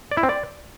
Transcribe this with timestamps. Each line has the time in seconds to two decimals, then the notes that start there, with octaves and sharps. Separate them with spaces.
0.11 D5
0.17 E4
0.23 C4
0.29 D5